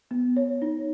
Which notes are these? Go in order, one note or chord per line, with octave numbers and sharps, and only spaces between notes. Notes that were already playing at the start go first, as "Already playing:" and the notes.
B3
C#5
D#4